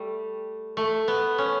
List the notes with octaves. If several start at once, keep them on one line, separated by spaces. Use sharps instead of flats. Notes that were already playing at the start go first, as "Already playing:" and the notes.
Already playing: G3 A3
A3
B3
C#4